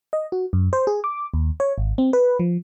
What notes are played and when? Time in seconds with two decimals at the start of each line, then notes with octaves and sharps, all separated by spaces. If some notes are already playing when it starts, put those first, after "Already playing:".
0.13 D#5
0.32 F#4
0.53 F#2
0.73 C5
0.87 G#4
1.04 D6
1.34 D#2
1.60 C#5
1.78 G#1
1.98 C4
2.13 B4
2.39 F3